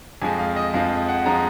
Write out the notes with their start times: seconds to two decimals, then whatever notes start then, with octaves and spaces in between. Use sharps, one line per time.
0.22 F2 F3 G#3 G#5
0.39 F5
0.56 D#5
0.74 F2 F3 G#3 F5
1.09 F#5
1.26 F3 G#3 A#5